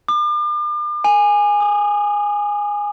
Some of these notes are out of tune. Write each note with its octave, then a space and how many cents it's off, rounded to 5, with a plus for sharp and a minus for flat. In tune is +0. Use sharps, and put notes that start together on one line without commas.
D6 +40
G#5 -10
D#6 -15